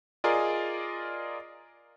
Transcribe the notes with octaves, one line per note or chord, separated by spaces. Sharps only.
F4 G#4 A#4 D5 D#5